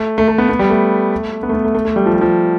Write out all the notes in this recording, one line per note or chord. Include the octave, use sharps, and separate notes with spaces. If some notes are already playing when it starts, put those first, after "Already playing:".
Already playing: A3
A3
A3
B3
B3
G3
A3
B3
A3
B3
A3
A3
A3
G3
F3
G3
F3